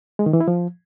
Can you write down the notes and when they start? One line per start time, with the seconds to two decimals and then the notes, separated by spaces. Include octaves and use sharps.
0.19 G#3
0.26 D#3
0.33 E3
0.41 E4
0.48 F3